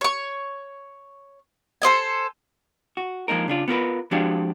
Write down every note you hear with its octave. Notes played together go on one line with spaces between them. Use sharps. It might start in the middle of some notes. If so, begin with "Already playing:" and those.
C#5 C#6
A4 C5 D#5 G#5
F#4
F3 G#3 A#3 D#4 A#4
C#3 D4 F4
B3 F4 A#4 B4
F3 G#3 D4 F#4 G4 F5